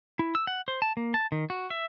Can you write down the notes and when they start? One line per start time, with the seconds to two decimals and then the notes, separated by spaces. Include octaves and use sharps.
0.19 E4
0.35 E6
0.47 F#5
0.68 C5
0.82 A5
0.97 A#3
1.14 A5
1.32 D#3
1.50 F#4
1.70 E5